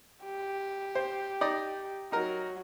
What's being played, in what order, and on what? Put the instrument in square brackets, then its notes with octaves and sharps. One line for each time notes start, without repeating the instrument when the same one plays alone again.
[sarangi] G4
[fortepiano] C5
D#4 D5 D#5
[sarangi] F#3 [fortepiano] D#4 A#4